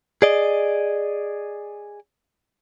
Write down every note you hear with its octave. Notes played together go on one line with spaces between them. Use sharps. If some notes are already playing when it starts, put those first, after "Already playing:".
G#4 D5 D#5